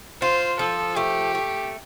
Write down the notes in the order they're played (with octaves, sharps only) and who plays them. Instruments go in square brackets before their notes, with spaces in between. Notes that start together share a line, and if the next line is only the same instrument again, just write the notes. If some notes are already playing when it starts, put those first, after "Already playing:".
[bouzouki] F4 [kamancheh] C5
[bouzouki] F3 [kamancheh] A4
[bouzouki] A3 [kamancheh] G4
[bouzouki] A3